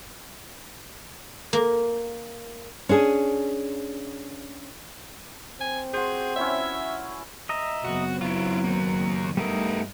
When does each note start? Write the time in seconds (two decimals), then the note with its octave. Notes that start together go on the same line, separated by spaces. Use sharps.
1.53 A#3
2.89 C#4 D4 G#4
5.61 C4 G#5
5.93 F#4 G#4 C5
6.36 C#4 E4 C#5 E5
7.49 D#5 E5 A#5
7.84 F#1 B3 C4 F#4
8.21 F#3 E4 F4
8.64 D#3 A#3
9.37 G2 G3 A3 B3 D#4 A#4